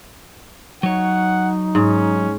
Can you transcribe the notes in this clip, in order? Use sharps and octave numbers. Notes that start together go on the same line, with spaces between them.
F#3 D#4 C#5 F#5
G#2 C#4